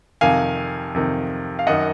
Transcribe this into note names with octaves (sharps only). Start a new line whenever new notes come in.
F2 C3 D#3 F5 G#5
F2 C3 D#3
F5
F#2 D#3 D#5 F#5